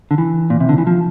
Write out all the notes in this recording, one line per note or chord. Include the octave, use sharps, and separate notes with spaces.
D3
E3
A#2
C3
D3
E3
F3